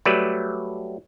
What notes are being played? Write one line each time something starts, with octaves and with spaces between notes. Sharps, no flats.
F#3 G3 A3 B4 D5